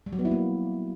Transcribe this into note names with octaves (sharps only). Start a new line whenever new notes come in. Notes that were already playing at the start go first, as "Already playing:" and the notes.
G3
F#3
B3
E4
A#3